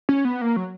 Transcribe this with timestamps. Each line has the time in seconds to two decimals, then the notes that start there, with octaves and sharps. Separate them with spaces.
0.09 C#4
0.25 B3
0.41 A#3
0.56 F#3